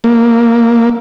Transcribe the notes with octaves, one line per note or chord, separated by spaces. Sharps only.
A#3